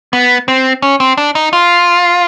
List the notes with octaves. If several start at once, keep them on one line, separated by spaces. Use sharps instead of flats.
B3
C4
C#4
C4
D4
D#4
F4